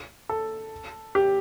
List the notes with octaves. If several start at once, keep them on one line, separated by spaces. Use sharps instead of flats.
A4
G4